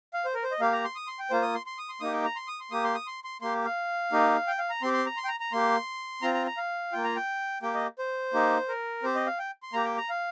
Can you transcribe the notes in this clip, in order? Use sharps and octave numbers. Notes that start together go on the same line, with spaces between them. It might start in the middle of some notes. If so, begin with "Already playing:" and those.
F5
C5
A#4
C5
D#5
A#3 G4 F5
A#5
C6
D#6
C6
G5
A#3 F4 C5
D#6
C6
C6
D#6
C6
A#3 D#4 G4 D#6
G5
A#5
C6
D#6
C6
A#3 G4 D#6
C6
D#6
C6
C6
A#3 G4 C6
F5
A#3 D#4 G4
G5
F5
A#5
C4 G4 C6
C6
A#5
C6
G5
A#5
A#5
A#3 G4 C6
C4 F4 A#5
A#5
A#5
F5
A#3 F4 G5
A#5
G5
A#3 G4 G5
D#5
C5
A#3 D#4 G4
A#4
C4 G4 C5
D#5
F5
G5
C6
A#3 G4 A#5
G5
A#5
F5